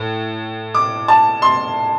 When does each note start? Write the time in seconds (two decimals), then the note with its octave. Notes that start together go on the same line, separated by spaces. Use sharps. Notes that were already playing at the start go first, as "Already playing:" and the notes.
Already playing: A2
0.75 D6
1.08 A5
1.42 C6